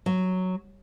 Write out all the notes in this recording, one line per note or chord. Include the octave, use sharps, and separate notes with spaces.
F#3